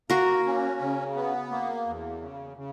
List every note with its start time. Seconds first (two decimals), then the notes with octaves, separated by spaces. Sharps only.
0.10 A#3 F#4 A#4
0.45 C#4
0.81 C#3
1.15 B3
1.51 A#3
1.86 E2
2.21 C#3
2.57 C#3